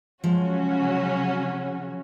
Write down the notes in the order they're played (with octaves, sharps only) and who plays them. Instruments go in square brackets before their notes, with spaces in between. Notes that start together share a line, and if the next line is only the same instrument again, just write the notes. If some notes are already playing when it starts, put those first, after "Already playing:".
[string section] C#3 F#3 C#4 F#4 [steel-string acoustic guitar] F3 G#3